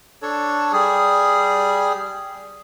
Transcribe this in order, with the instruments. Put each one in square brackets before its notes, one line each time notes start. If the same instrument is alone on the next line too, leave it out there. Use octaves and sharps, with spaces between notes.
[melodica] D4 A4 C#5
G3 G#4